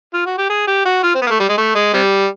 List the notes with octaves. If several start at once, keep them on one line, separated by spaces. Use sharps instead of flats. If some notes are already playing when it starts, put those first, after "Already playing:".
F4
F#4
G4
G#4
G4
F#4
F4
C4
B3
A#3
A3
G3
G#3
A3
G#3
C3 G3